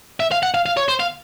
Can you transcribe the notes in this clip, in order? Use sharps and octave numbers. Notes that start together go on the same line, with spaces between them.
E5
F5
F#5
F5
F5
C#5
C5
F5